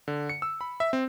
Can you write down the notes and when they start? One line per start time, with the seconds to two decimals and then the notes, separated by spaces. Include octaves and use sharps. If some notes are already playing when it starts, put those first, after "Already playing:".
0.08 D3
0.29 C#7
0.42 E6
0.61 B5
0.80 E5
0.93 C4